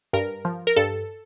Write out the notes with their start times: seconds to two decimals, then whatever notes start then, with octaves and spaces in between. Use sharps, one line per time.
0.13 G2 A#4
0.45 F3
0.67 A#4
0.76 G2 A4